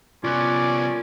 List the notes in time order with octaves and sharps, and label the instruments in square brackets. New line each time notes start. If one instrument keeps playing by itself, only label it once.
[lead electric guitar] C2 B3 [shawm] C#4 [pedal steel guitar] F4 F#6 [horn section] A#4 D5